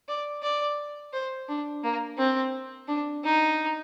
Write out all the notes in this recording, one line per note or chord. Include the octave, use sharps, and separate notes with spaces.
D5
D5
C5
D4
A#3
C4
D4
D#4